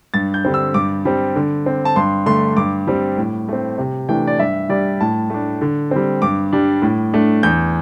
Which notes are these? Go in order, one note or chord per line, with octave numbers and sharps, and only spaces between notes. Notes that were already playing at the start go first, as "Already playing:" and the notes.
G2 A6
G6
D3 G3 C4
E6
G2 D6
G3 C4
D3
C4
A5
G2 C6
D3 A3 C6
G2 D6
G3 C4
A2
A3 C4
C3
E3 A3 D4 G5
D5
G2 E5
G3 D4 D5
A2 A5
A3 D4
D3
G3 C4
G2 D6
G3 D4
A2
A3 D4
E2 G6